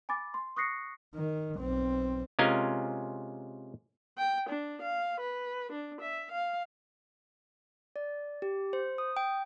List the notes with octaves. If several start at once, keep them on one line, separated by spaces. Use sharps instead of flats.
G#5 B5 D6 A6
C6
C#6 D#6 F#6 A#6 C7 C#7
D#3
B1 C4
C3 G#3 C#4 F4 A#4 G#5
G5
D4
F5
B4
D4
E5
F5
D5
G4
C5
D#6
G5